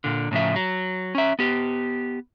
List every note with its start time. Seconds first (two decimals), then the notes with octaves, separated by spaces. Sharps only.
0.04 A#2 D3
0.31 A2 C#3 F3 E5
0.56 F#3
1.15 C#4 E5
1.39 B3 G4